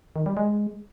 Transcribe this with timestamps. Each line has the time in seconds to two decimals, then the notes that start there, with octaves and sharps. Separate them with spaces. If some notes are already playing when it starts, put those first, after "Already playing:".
0.16 D#3
0.26 G3
0.37 G#3